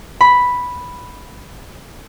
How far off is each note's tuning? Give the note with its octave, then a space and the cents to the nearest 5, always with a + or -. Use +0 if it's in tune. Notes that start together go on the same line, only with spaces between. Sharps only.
B5 +0